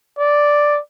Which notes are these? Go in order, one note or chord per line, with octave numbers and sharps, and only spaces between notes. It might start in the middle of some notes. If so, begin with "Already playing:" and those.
D5